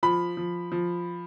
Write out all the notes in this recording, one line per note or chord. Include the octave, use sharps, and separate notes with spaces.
F3 B5
F3
F3